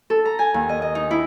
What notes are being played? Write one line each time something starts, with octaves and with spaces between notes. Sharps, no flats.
A4
A#5
G#5
D#2
D#5
D#5
D#4
E4